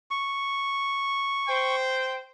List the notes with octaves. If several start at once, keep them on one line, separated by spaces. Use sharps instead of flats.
C#6
C5 G5